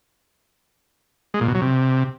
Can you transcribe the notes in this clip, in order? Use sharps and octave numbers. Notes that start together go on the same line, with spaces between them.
G#3
A#2
B2
F#3
C3